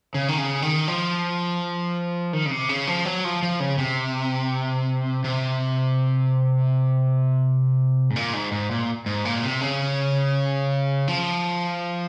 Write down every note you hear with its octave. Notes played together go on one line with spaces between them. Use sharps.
C#3
D#3
C#3
D#3
F3
D#3
C#3
C3
C#3
F3
F#3
F3
F3
C#3
C3
C3
G#2
A#2
G#2
G#2
A#2
G#2
A#2
C3
C#3
F3